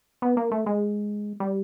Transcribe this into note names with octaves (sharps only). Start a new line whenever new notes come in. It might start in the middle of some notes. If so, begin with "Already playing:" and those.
B3
A#3
A3
G#3
G3